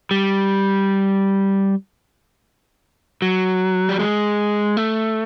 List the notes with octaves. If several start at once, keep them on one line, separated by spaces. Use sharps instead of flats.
G3
F#3
G3
G#3
A3